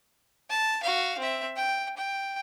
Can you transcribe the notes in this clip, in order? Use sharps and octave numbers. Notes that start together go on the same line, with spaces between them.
A5
F#4 F5
C4 E5
G5
G5